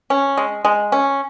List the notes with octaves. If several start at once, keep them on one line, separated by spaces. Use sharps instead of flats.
C#4
G#3
G#3
C#4